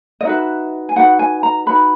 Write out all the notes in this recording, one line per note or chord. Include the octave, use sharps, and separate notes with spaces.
D#5
D#4 F#4 B4 E5
G#5
D#4 F#4 B4 F#5
G#5
A#5
D#4 F#4 B4 B5